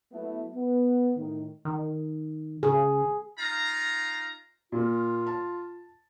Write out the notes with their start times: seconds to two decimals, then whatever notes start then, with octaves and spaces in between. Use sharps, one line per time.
0.12 F#3 A3 B3 E4
0.54 B3
1.16 A2 D#3
1.65 D#3
2.63 C#3 G#4
3.38 D#4 F4 F5 A#5
4.72 A#2 A#3 F4
5.27 A5